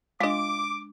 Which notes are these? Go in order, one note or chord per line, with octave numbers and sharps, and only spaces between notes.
G#3 D4 F4 D#5 D6